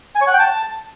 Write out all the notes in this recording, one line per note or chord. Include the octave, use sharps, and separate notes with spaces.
G#5
C#5
F#5
G5
A5